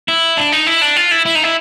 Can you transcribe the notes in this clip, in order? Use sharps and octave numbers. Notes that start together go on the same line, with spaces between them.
E4
D4
D#4
E4
D4
F4
E4
E4
D#4
E4